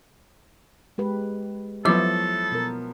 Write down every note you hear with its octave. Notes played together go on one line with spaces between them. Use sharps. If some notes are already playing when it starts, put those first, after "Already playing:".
G#3 G4 B4
F3 F#3 B3 E4 A4 C#5 D6
B2 A#4